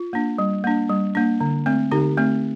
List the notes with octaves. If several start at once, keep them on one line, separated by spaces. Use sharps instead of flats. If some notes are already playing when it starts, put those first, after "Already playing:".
Already playing: F4
A#3 D4
G3
A#3 D4
G3
A#3 D4
D3
A3 C4
D3 D#4 G4
A3 C4